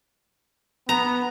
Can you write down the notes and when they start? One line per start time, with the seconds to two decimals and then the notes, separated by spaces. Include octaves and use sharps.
0.89 B3 A#5